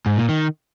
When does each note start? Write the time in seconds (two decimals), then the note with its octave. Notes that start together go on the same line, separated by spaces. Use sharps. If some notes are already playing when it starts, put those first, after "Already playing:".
0.06 G#2
0.17 A#2
0.29 D#3